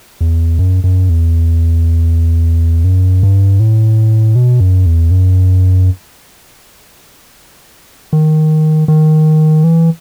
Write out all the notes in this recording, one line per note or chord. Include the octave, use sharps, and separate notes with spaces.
E2
F#2
F#2
E2
F#2
G2
A2
B2
F#2
E2
F#2
D#3
D#3
E3